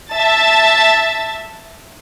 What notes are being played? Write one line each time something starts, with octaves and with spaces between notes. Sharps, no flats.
E5 A5 A6